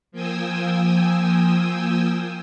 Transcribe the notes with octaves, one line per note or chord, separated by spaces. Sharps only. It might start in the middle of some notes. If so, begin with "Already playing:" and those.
F3 A#3 G5 G#5 D#6 E6